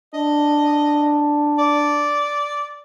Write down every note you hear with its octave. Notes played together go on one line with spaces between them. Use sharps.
D4 D#5
D5